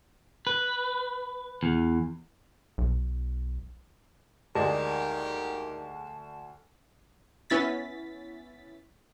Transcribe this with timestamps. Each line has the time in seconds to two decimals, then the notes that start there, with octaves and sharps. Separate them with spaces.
0.47 B4
1.63 E2
2.78 B1
4.55 D2 D#3 G#3 A#3 G4 D5 A5 A#6
7.50 B3 C#4 E4 A6 B6